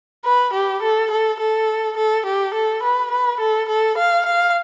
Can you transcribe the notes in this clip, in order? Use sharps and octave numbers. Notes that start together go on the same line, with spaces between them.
B4
G4
A4
A4
A4
A4
G4
A4
B4
B4
A4
A4
F5
F5